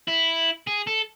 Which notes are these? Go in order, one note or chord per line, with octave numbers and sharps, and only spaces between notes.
E4
G#4
A4